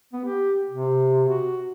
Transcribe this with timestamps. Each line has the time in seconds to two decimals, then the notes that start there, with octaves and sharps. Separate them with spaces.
0.13 B3
0.25 G4
0.71 C3
1.29 F#4